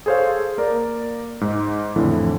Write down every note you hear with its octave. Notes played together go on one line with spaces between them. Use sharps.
G#4 A4 C5 C#5 F5
A#3 A#4 D5
G#2
F2 A2 D3 E3